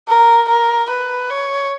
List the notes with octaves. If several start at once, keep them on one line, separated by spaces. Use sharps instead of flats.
A#4
A#4
B4
C#5